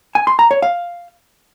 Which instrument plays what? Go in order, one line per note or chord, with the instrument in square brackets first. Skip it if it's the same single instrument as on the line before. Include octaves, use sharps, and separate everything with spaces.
[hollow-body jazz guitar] G#5
C6
A#5
C#5
F5